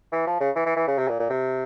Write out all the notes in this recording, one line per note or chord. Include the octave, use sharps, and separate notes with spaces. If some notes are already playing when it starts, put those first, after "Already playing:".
E3
F3
C#3
E3
E3
E3
C#3
C3
A#2
A#2
C3